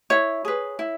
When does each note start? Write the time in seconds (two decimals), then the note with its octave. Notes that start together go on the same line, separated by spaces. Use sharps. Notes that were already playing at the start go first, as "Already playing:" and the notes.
0.10 E4 C#5
0.45 G#4 B4
0.79 E4